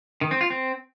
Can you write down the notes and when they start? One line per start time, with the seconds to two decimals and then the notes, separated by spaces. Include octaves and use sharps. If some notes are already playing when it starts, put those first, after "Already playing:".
0.21 D#3
0.31 C4
0.41 F4
0.50 C4